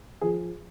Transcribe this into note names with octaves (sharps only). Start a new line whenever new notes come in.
F3 G#4